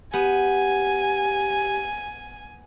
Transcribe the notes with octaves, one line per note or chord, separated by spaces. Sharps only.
B3 G4 G#5